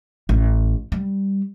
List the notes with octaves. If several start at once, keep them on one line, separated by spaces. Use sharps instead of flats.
A1
G3